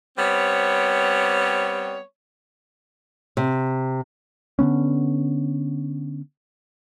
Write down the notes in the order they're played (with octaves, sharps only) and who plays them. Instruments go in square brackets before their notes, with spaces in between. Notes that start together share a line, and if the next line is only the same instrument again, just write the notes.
[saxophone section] G3 B3 C4 C#5
[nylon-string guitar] C3
[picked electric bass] D3 F#3 B3 C#4